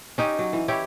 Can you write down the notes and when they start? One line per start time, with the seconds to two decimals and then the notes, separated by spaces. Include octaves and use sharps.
0.18 C#4 D#4 G4
0.39 F#3
0.53 E3
0.68 E4 G4 C#5